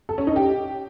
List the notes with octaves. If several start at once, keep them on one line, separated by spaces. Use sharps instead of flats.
A4
C#4
D#4
G4